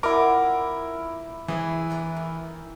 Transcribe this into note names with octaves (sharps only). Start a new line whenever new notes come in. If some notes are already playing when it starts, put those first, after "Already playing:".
C4 E4 F4 A#4 F#5 D6
E3 G#4 C5
B3 D4 A#5
D#3